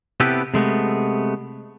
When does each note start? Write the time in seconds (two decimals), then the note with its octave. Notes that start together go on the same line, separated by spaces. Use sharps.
0.20 C3 B3 E4 G4 A4 B4
0.54 C3 G#3 A3 B3